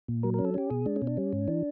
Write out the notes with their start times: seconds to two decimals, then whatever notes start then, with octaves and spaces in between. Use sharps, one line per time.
0.08 A#2
0.23 F#3 A#4
0.34 C#4 A#4
0.45 A4
0.54 C#4 G4
0.70 B2 G#4
0.86 G#3 D4
0.96 C#4
1.02 B2
1.07 D4
1.17 G3 C#4
1.33 G#2
1.48 E3 D4